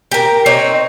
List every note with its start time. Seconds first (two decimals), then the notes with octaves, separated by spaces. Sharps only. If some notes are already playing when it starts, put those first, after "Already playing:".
0.11 G4 A#4
0.46 C4 D4 D#4 C#5